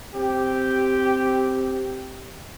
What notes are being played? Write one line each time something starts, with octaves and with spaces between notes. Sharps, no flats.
C4 G4